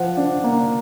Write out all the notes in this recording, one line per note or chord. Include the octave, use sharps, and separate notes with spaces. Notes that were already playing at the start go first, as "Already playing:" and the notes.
Already playing: F3 F#5
D4
A#3